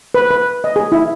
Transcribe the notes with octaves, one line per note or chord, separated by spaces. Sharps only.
B4
B4
D#5
G#4
E4